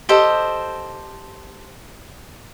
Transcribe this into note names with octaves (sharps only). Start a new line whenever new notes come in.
G4 A4 C5 D#5